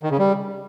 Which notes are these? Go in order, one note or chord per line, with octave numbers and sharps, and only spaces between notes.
D#3
C#3
G3